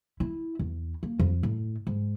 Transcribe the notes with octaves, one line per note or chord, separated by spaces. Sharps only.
E4
E2
A#3
F2
A2
G#2